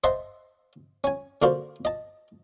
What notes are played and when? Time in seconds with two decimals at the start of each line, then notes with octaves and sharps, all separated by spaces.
0.04 C5 D#5 E5 F#5 A5 C6
1.04 C#4 G#5
1.42 D3 A#3 F#4 A#4 C5 D5
1.85 D#5 A5